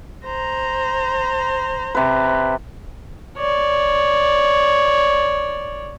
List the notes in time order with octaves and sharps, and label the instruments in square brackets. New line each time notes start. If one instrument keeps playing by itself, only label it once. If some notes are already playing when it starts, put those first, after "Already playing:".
[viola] C5 A#5
[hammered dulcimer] C3 B4
[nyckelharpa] C#5 D5